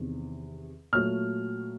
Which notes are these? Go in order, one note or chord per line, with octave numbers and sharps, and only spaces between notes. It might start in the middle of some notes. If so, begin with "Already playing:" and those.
Already playing: E2 C3 D#3
A#2 F#3 A3 F6